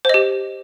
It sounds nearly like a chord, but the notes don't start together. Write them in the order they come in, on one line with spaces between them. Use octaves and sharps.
C5 D#5 G4